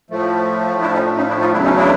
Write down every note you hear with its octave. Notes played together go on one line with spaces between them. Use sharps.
A2 F3 A3
D4 E4
C#4 D#4
D4
C#4 D#4
D4 E4
D#4 F4
E2 C#3 F#3 A3 D4 E4
C#4 D#4
D4 E4